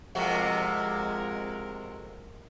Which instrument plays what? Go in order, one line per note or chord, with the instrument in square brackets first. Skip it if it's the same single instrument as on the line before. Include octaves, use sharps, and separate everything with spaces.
[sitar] F2 C3 F#4 [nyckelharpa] G#3 A#4